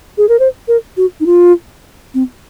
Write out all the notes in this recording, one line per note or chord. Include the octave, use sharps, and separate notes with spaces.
G#4
A#4
C5
A#4
F#4
D#4
F4
C4